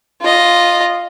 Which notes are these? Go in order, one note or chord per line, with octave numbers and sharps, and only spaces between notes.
F4 D#5